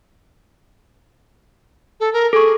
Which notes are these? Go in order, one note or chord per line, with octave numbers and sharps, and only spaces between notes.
A4
A#4
G#4 A4 C#6